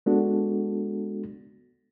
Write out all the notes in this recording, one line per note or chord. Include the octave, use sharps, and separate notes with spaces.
G#3 B3 D4 F#4 A4